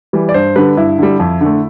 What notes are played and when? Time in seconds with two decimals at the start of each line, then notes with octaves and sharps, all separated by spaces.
0.13 E3 G3
0.29 D5
0.34 G2 C5
0.56 D3 G3 B4
0.77 G2 E4
0.99 D3 G3
1.19 F2
1.41 D3 A3